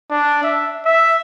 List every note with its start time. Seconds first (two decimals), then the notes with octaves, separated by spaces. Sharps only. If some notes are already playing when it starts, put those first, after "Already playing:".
0.10 D4
0.43 E5
0.85 E5